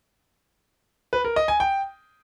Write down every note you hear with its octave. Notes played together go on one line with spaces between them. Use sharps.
B4
A#4
D#5
G#5
G5